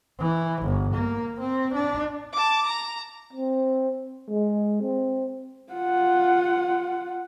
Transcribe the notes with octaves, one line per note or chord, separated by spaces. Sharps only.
E3
G1
A#3
C4
D4
A5 D6
A#5
C4
G#3
C4
F4 F#5